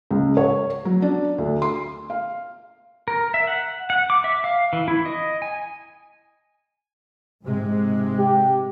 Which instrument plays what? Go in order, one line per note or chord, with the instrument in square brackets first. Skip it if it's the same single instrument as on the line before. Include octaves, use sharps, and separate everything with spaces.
[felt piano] C#2
C#5
F#3
D4
D2
C6
F5
[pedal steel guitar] A#4
E5
F#5
F#5
D6
E5
F5
E3
E4
D#5
G#5
[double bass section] G#2 C3 G#3
[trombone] G4